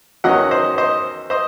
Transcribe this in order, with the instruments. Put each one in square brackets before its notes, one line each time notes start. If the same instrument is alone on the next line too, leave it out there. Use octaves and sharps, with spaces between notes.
[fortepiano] E2 D#3 F#3 C#4 D#5 F#5
C5 D#5
C5 D#5
C5 D#5